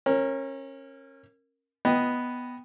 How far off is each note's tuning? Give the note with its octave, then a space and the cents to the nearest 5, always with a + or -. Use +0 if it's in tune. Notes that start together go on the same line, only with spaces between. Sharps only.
C#4 -30 A#4 -10
B3 +0 D#5 +0 G5 +0